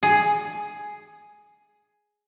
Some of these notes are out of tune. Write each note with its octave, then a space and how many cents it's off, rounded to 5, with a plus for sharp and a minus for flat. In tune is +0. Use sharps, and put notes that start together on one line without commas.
G#4 +5